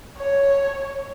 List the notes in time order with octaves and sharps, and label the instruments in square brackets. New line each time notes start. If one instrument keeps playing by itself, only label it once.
[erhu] C#5